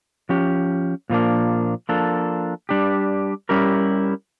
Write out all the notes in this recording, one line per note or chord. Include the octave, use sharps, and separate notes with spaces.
F3 C#4 G4
A#2 F3 A#3 D4
F3 A#3 D4 A4
G3 D4 G4
G3 C#4 E4 G4 A#4